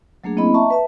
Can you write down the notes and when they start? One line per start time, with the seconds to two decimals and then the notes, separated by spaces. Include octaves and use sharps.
0.24 F#3 A3 A#3 D4 G#4
0.37 A#3 C4 C#4 E4 D#5 B5
0.54 D#5 E5 A5 A#5 C#6
0.70 B4 E5 A5